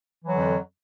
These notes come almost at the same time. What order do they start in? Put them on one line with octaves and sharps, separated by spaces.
E3 F#3 D3 F2